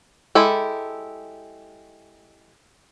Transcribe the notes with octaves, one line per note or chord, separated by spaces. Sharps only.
G#3 E4 G4 A4